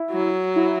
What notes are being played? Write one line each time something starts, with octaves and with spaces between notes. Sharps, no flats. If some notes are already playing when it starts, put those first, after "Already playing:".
Already playing: E4
F#3
E4